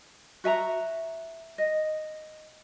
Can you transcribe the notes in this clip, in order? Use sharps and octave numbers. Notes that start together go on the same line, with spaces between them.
F#4 E5 G#5 A#5
D#5